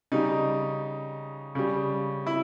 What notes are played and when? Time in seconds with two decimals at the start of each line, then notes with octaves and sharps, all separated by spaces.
0.12 C#3 G3 D#4
1.55 C#3 G3
2.27 E4